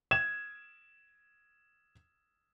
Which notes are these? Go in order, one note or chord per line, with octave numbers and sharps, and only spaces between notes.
G#6 E7